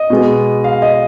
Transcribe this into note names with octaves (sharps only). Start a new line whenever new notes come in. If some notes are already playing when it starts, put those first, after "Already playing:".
Already playing: D#5
B2 G#3 B3
F5
D#5